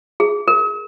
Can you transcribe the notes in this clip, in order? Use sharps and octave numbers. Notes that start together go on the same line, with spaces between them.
G#4
A#4